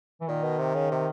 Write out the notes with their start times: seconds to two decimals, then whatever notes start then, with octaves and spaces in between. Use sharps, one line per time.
0.21 E3
0.28 A#2 D#3
0.44 B2
0.59 C3
0.75 C#3
0.91 C3